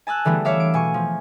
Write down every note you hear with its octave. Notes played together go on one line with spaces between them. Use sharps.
G#5 A5 E6 F#6
D3 E3 G3 A3 B3
C#5 E5 F5 D6 E6
D7
B2 G#5 C#6
F3